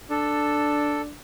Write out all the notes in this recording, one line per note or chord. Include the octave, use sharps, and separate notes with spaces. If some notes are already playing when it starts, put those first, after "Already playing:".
D4 A4